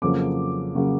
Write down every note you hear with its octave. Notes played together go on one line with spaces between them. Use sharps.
F2 C#3 F#3 A#3 C#4 D6
C#3 F#3 A#3 C#4